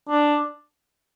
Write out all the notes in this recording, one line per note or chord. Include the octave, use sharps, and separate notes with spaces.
D4